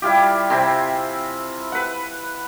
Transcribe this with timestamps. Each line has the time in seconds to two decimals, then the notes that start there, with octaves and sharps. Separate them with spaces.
0.02 G3 E4 F4 G4
0.50 C3 C4 G#5 B5
1.72 B4 F#5